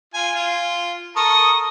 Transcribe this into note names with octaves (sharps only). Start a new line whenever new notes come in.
F4 G#5
F4
A4 A#4 C#6 D#6